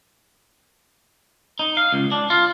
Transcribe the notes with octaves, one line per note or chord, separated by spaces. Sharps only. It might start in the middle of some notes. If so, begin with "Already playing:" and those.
D#4
F5
C#2
D4
F4